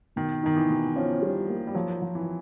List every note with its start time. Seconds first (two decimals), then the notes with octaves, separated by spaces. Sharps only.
0.16 B2 D#3
0.43 D#3 D#4
0.56 E3
0.69 B2
0.96 F3 C#4
1.22 G3
1.49 A#3
1.67 G3
1.75 F3 F#3
2.02 F3
2.15 E3